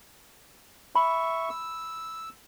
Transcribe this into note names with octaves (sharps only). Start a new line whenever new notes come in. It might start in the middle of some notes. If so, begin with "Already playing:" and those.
E5 B5 C#6
E6